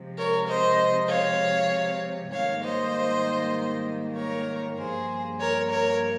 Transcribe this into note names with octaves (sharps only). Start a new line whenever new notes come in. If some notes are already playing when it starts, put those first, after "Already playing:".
Already playing: C3 F3 G#3
A#4 C#5
C5 D#5
C#5 F5
G#2 D#3 G3 A#3 C#5 F5
C5 D#5
A#4 C#5
G2 F3 A#3 G#4 C5
A#4 C#5
A#4 C#5